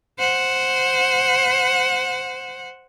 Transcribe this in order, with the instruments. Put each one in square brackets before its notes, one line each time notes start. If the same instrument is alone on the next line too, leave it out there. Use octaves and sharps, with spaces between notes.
[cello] C5 F#5